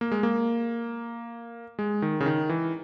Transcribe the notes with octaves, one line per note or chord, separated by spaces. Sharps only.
A#3
G#3
A#3
G#3
D#3
C#3
D#3
E3